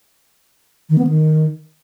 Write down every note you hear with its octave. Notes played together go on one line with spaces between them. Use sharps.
D#3
B3
D#3